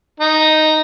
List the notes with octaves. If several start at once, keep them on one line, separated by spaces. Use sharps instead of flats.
D#4